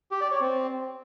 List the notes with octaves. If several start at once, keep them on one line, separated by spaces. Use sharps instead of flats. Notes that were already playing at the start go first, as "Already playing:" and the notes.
G4
D5
C#5
C4